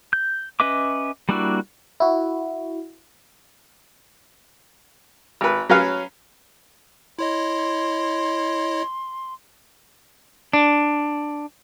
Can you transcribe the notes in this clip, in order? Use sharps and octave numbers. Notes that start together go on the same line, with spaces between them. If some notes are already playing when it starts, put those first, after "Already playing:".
G6
C#4 B4 D#5 E5 D6
G3 A#3 D4 E4 F#4
E4 F#4
G#1 B4
F#3 C#4 B4 F5
E4 C#5 D#5 C6
D4